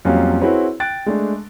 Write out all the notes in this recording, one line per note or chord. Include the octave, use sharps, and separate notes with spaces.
F2 F#3 G3 A#3 C#4 F5
C4 E4 F#4 G#4 B4 C#5
G5 F#6 A6 D7
G#3 A3 D4